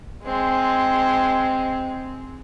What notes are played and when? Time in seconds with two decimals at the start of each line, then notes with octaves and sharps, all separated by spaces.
0.24 G#3 C4